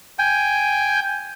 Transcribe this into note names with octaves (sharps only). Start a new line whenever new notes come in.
G5 G#5